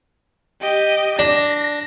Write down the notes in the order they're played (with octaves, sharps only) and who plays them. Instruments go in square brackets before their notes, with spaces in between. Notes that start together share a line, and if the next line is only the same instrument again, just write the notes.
[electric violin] G4 D#5
[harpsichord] D4 [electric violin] A#6